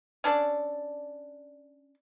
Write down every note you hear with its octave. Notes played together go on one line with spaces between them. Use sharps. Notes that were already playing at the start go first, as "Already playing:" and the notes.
C#4 D4 A4 D5